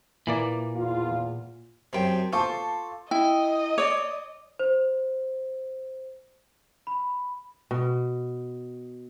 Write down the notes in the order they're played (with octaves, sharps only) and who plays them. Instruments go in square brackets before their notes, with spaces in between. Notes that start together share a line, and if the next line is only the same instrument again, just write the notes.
[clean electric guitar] A#2 [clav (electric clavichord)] E3 A#3 D5
[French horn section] E2 F4
[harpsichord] F#2 C3 [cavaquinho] G5 A5 C6
[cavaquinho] F4 C5 D6 [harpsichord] A4 [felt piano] A5 C#6
[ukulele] E4 [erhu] D#5 [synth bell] G5
[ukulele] C#5 D5 [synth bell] D6
[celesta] C5
B5
[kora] B2